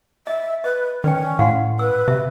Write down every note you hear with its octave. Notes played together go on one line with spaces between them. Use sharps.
D#5 E5
B4 D#5
D#3 C#4 B4 D5 G5
A2 F5 F#5 C6
B4 E6
C3 E5